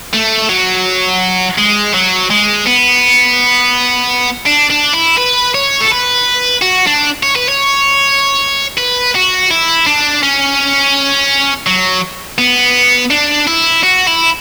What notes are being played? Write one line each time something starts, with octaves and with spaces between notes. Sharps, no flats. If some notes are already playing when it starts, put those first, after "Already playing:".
A3
F#3
G#3
F#3
G#3
B3
D4
D4
E4
B4
C#5
A4
B4
F#4
D4
C#5
B4
C#5
B4
F#4
E4
D4
C#4
F#3
B3
D4
E4
F#4
E4